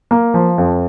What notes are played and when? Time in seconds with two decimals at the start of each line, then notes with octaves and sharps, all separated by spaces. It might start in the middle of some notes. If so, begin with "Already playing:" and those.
0.11 A#3
0.34 F3
0.58 F2